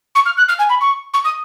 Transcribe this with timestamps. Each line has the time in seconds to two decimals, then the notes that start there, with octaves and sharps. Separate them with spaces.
0.15 C#6
0.26 F6
0.37 F#6
0.49 F6
0.59 G#5
0.70 B5
0.81 C#6
1.14 C#6
1.25 D#6